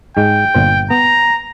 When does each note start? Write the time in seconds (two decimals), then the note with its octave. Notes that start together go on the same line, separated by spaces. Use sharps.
0.17 G#2 G#3 G5
0.55 G1 A#2 C5
0.90 B3 A#5